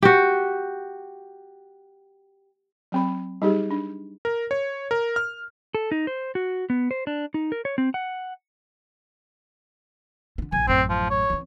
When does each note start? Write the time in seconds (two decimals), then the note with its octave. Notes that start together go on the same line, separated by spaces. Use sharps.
0.03 F#4 G4
2.92 F#3 C4 B5
3.42 G3 D#4 G4 G#4
3.71 D4
4.25 A#4
4.51 C#5
4.91 A#4
5.16 F6
5.75 A4
5.92 D#4
6.07 C5
6.35 F#4
6.70 B3
6.91 C5
7.07 D4
7.34 D#4
7.52 A#4
7.65 C#5
7.78 C4
7.94 F#5
10.38 D3 C4
10.52 D#1 A#1 G#5
10.67 A1 F#2 C4
10.89 F3
11.10 C#5
11.30 E3 C4